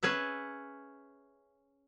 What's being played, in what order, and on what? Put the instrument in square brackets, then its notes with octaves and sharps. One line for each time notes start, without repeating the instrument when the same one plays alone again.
[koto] C#4 G#4 B4 E5